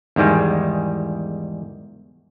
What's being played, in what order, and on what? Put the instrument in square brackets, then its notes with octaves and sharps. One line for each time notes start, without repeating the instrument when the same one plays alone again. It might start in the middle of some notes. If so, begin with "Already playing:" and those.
[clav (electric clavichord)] E2 G#2 D#3 G3 G#3